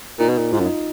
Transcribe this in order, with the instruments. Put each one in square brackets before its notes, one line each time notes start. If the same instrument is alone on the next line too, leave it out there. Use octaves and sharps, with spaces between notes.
[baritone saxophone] A#2 [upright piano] D#4
[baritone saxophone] B2
A#2
[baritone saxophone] G#2 [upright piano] F4
[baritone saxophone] F#2
[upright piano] D#4